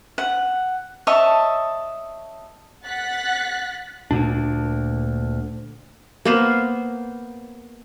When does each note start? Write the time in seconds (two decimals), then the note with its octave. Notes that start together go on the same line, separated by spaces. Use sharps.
0.18 F#5
1.07 C#5 D#5 E5 A5
2.86 F#5 F#6 A6 B6
4.11 D2 A#2 D4
6.25 A#3 B3 C5